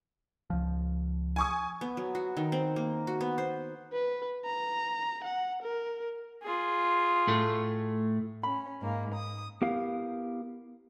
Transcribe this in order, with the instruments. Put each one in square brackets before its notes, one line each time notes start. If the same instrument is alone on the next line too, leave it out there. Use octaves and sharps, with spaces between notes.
[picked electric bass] C#2 F3
[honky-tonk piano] G#5 C#6 D#6
[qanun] B3
F#3
F#4
D#3
C4
A#3
F#4
B3
C5
[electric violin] B4
A#5
F#5
A#4
[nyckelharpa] F4 G#4
[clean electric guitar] A2 A3
[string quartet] C#4 [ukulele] B5
[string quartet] G#2 A#3
D#6
[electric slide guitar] B3 E4 G4 A#4 F5